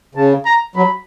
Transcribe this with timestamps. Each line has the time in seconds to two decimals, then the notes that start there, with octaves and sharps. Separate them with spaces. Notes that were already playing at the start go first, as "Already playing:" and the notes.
0.15 C#3 A5
0.45 A#5
0.76 F#3 B5